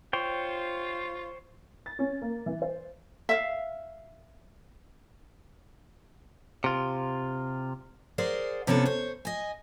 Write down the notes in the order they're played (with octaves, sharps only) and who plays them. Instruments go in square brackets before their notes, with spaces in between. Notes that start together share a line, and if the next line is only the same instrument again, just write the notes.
[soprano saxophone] F4 [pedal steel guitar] C5 C#5 G5
[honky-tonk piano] A6
C#4
A#3
E3
C5
[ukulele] E5 F5
[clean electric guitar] C3 F4
[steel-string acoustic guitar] G#4 A#4 C5 D5 F#5
C3 B3 C#4 D4 F4 A4
C5 C#5
D#5 G#5